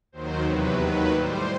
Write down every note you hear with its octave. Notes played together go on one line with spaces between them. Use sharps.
D#2 D#3 F#3 C5
E2 C3 F#3 B4
D#2 D#3 F#3 B4
A2 G3 C5